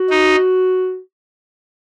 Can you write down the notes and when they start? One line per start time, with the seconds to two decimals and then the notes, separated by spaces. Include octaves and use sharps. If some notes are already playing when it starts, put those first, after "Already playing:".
Already playing: F#4
0.10 D#4